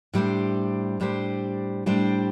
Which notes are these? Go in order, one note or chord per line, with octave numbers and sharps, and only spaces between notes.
A2 G3 D4 G4 C5
A2 G3 D4 G4 C5
A2 G3 D4 G4 C5